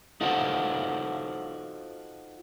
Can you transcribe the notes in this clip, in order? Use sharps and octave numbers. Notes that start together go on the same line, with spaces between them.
D#4 F4 F#4 A4 C5